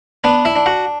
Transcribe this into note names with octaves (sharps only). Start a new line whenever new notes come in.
B3 D4 B4
E4 E5
D4
F#4 F#5